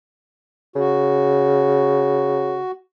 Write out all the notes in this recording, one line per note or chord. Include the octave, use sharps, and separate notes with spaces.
C#3 F#4